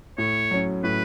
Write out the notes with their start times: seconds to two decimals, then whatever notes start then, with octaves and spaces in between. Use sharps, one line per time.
0.18 A2 C#5
0.51 F#3 C#4
0.84 A2 B4